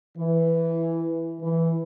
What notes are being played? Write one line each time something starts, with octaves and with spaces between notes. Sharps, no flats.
E3
E3